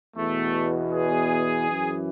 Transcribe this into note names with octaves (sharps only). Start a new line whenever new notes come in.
E2 B2 A3
G#4
F#2 E3